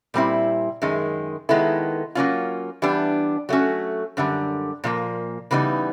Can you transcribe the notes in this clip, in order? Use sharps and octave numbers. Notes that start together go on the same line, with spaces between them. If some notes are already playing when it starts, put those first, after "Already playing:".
A#2 G3 C4 E4
F#2 D#3 G#3
D#3 G#3 B3 E4 A4
F#3 A#3 C#4 F4
E3 G3 B3 D4 G4
F#3 A3 C#4 F#4
F#2 D3 G3
A#2 F3 A#3
C#3 E3 G3 B3 D#4